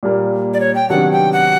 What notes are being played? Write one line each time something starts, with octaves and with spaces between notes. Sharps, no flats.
A#2 G3 A#3
D5
C#5
G5
C3 D#3 F#3 B3 D4 F#5
G5
F#5